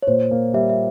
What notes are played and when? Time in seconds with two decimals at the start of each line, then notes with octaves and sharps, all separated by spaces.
0.03 C#5
0.07 A#2 C5
0.31 A#3
0.54 G3 E5
0.69 E5